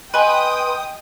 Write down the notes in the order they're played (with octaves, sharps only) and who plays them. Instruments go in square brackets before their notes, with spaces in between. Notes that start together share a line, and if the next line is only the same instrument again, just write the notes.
[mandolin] B4 [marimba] D#5 G#5 [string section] G5 D#6 [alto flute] C6